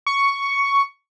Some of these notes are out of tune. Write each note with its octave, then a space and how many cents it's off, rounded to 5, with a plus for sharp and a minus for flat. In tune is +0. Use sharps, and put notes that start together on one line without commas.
C#6 +5